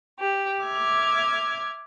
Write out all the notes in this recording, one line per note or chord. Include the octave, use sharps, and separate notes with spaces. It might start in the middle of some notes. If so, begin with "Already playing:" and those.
G4
E5 D6 F6 G#6